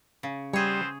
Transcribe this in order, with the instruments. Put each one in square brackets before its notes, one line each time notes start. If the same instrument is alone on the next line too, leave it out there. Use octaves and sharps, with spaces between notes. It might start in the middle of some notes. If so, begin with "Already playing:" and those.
[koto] C#3
[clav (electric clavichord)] G3 [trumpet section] B3 C4 C5 [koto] G#4 C#5